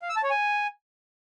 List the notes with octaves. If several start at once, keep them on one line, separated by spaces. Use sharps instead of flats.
F5
E6
A5
C#5
G#5